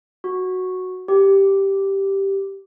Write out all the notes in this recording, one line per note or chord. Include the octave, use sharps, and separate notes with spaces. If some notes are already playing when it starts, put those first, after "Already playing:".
F#4
G4